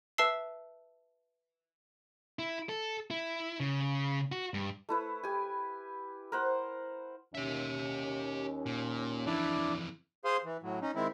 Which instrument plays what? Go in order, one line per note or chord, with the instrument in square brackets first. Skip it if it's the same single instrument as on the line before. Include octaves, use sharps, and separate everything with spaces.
[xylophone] B4 E5 A5 E6 C7
[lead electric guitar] E4
A4
E4
C#3
F#4
G2
[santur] A3 E4 B4
G4 G#5
A#4 C5 F#5
[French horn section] D#2 C#4 [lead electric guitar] G4 E5
[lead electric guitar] A#2
[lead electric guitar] F2 E3 [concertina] D4 E4 D5
[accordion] G#4 C5 F5 C6 D#6
E3
A2 F#3
C#4 D#4
D#3 G#3 C4 E4